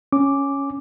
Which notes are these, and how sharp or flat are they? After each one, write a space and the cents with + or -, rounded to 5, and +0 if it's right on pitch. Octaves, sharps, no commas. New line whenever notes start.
C#4 +0 D6 +0